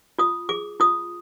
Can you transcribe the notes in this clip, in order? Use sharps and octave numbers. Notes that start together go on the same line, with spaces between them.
F4 D#6
G#4 D6
F4 D#6